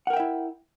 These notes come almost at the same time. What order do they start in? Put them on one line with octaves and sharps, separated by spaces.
F#5 A#4 G5 E5 E4